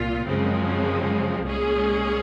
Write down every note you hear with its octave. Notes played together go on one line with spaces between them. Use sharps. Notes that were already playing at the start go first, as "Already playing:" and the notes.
Already playing: C2 A#2 F4
F#2 C#3 F3 G#3 C4
C2 A#2 G#3 C#4 G#4